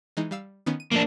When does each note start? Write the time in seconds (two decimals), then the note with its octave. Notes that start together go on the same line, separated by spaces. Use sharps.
0.17 E3 G#3 D#4
0.31 G3 F5 E6
0.66 D#3 B3 C#4
0.80 D#7
0.92 F3 A3 A#3 D4